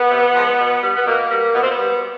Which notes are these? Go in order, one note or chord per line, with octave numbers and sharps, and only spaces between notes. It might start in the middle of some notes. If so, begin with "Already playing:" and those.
Already playing: B3
C3
F3 G#3
B2
G3
B3
B2 A#3
G3
B2 B3
C4
B3
G3